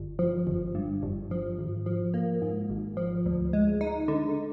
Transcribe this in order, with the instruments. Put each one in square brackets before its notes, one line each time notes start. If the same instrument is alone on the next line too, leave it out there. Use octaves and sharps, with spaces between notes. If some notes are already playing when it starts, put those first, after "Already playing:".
Already playing: [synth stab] G1
F3
G1
G2
G1
F3
G#1
F3
A#3
G#2
G#1
F3
D2
G#3
D#4
D3